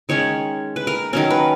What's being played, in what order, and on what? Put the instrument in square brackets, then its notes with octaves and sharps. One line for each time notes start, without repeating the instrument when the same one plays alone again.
[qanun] D#3 G#3 C#4 C#5
B4
A#4
D#3 F#3 C#4 A#4
B4